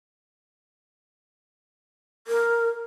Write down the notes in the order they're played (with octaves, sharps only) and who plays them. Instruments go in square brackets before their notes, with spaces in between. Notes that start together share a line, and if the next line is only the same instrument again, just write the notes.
[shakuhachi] A#4